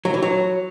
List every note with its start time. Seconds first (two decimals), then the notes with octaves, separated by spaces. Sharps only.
0.05 F#3
0.14 E3
0.23 F#3